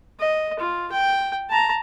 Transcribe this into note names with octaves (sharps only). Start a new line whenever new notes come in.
D#5
F4
G5
A5 A#5